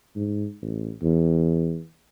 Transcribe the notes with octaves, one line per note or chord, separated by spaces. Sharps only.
G#2
A1
E2